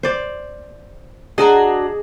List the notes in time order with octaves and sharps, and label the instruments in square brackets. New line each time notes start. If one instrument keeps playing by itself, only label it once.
[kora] C5 D5
[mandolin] D4 F#4 A#5 [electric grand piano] G#4 [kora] D#5